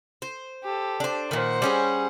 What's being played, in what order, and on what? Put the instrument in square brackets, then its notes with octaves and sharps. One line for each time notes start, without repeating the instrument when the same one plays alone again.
[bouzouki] C5
[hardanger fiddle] G4 A4
[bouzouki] D4 C5
[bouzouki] A#2 D#3 [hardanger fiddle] C5 F#5
[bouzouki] G3 C#4 G#4